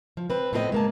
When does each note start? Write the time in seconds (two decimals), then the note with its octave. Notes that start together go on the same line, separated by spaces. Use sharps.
0.17 F3
0.30 C4 B4
0.53 A2 B3 C4 A#4 D#5
0.72 G#3 A#3 A5